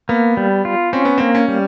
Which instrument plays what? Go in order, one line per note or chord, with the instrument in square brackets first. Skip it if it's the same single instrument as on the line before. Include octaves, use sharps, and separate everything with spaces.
[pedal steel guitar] A#3 [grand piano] B3
[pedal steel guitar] G3
F4
[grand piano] C4 [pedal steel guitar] C#4
[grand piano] B3
[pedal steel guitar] A#3 [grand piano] C4
[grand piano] C#4
[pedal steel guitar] G3